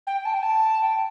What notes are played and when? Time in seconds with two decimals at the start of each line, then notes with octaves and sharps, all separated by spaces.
0.07 G5
0.25 A5
0.34 G5
0.43 A5
0.81 G5